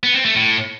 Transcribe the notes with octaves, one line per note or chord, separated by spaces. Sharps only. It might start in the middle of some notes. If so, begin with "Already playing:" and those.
B3
C4
A3
A2